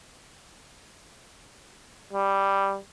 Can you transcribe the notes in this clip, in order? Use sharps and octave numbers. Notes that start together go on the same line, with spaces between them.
G3